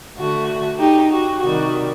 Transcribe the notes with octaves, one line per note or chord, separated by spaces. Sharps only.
D3 A3 F#4
D#4 G4
F#4
C3 D#3 G3 F#4